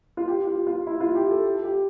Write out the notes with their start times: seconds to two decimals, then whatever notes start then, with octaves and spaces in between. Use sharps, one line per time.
0.17 F4
0.28 G4
0.47 F4
0.67 F4
0.87 E4
1.00 F4
1.15 G4
1.31 A4
1.64 G4